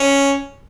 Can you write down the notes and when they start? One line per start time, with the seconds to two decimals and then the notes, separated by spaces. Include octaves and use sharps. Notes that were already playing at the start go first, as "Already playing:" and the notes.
Already playing: C#4